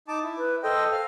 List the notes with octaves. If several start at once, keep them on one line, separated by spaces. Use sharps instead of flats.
D#4 A5 D6
E4
B4
A4 C5 D#5 G5
F5 F6